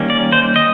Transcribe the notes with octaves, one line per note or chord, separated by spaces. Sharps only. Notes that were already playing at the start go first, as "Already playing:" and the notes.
Already playing: D#3 G3 A#3 C#4
D5
C5
D#5